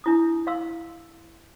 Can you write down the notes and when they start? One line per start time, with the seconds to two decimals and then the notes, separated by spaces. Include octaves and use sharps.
0.04 D4 E4 D#6
0.47 D#5 F5 C6 E6